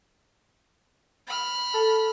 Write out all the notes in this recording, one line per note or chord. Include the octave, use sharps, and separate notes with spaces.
B5 F6
A4